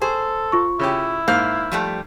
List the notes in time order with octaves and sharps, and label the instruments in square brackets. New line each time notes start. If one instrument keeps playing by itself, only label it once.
[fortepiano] G#4 [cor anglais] A4 [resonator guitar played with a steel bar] C5
[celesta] F4 C#6
[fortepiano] C#3 C#4 G4 [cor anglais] E4
[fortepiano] G#2 A#3 [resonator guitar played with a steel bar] F5 [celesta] F6 G6
[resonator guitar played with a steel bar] F3 G3 A3